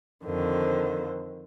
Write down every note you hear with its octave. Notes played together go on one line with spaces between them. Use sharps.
F2 D3 D#3 C5